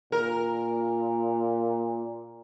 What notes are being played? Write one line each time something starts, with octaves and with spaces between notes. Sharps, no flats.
A#2 A#4